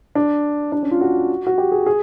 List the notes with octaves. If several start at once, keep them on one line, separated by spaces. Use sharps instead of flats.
D4
D4
C#4
F4
F#4
F#4
G4
G#4
G#4